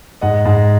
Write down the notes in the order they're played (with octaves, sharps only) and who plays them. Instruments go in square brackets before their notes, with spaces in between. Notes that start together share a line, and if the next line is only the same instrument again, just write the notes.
[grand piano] G#2 D#5 F#5
G#2